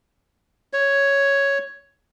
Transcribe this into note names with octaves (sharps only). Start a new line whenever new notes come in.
C#5